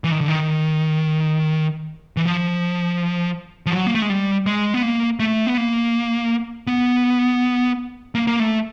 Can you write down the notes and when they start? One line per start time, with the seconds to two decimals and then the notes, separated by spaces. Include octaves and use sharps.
0.04 E3
0.12 D#3
0.21 D3
0.28 D#3
2.17 E3
2.25 F3
3.66 F3
3.72 F#3
3.87 A#3
3.95 A3
4.02 G#3
4.10 G3
4.46 G#3
4.74 B3
4.83 A#3
5.20 A3
5.47 B3
5.57 A#3
6.67 B3
8.15 A#3
8.27 A#3
8.40 A3